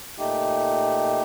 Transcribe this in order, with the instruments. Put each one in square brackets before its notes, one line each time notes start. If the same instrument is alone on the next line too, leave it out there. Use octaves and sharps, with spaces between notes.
[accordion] A#2 A3 D#4 G4